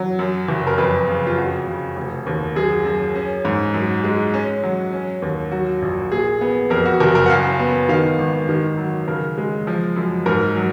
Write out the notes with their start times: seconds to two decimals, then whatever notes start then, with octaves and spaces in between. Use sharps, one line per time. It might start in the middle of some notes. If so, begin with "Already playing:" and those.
Already playing: F#3
0.19 F#2
0.48 F#1
0.67 A#4
0.78 F2 B4
1.08 C#3
1.27 F4
1.38 F2 F#4
1.67 C#3
1.97 F1
2.26 D#2
2.56 F#2 G#4
2.85 F#2
3.16 C#4
3.45 G#2
3.74 F#2
4.04 G#3
4.34 C#4
4.63 F#3
4.93 C#4
5.22 D#2
5.52 F#3 F#4
5.82 A#1
6.12 A#2 G#4
6.41 B3
6.70 F2 A#4
6.86 F#4
7.00 F#1 A#4
7.15 A#4
7.26 F#5
7.30 F#2 F5
7.60 B3
7.89 D#3 F5
8.19 G#1
8.49 D#3
8.78 F#3
9.08 C#3 A#4
9.38 G#3
9.67 F3
9.96 F#2
10.26 G#2 A#4
10.56 F#3